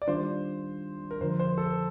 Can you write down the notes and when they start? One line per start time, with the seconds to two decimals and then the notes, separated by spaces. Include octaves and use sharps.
0.02 D5
0.08 D#3 G3 D4 F4 C5
1.11 A#4
1.21 F2 D3 F3 C5
1.39 C5
1.58 A4